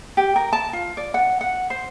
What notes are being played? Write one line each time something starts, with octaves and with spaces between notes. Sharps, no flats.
G4
A#4
A5
F4
D5
F#5
F#5
C5